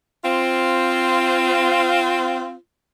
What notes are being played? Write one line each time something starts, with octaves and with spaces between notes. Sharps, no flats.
C4 F4